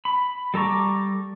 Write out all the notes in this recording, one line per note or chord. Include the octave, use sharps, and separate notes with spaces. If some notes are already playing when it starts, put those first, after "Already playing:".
B5
G3 A4 A#5 C#6 D6